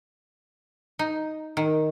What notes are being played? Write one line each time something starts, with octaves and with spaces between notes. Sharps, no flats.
D#4
D#3